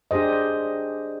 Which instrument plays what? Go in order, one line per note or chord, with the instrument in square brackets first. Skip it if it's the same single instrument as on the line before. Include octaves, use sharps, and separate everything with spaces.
[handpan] D4 G4 G#4 C5 D#5